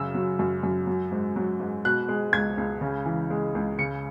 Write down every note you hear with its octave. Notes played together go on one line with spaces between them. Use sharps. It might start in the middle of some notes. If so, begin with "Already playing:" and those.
Already playing: F#2 C#3 E6
F#3
F#2
F#2
F#3
G#2
F#3
G#2
B2 F#6
G#3
C#2 G#6
C#2
C#3
E3
G#3
C#2
C#3 C#7